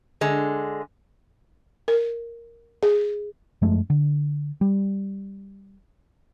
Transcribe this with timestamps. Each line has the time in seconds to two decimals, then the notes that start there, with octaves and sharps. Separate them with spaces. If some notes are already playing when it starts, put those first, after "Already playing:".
0.21 D3 G#3
1.88 A#4
2.83 G#4
3.62 F#2 F3 G#3 A3
3.90 D3
4.61 G3